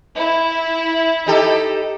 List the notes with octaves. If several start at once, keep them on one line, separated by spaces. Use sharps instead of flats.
E4
D#4 G4 A4